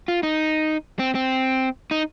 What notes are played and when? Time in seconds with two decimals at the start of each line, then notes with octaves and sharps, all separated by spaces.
0.08 F4
0.23 D#4
0.99 C4
1.15 C4
1.91 D#4